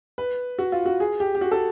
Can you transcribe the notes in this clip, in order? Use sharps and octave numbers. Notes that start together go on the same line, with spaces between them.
B4
F#4
F4
F#4
G#4
G4
G4
F#4
A4